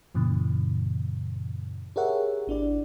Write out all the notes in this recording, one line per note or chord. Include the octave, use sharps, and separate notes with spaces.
F#2 A#2 C#3 E3
G4 G#4 A#4 C#5 E5 F#5
G#1 D4 E4 D5